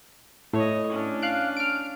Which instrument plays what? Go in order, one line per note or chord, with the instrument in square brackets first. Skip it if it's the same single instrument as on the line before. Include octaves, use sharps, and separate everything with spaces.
[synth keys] A2 [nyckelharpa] C#5 D#5
[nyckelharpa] C#4 D4
[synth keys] F5 F#6 D7
F6 D7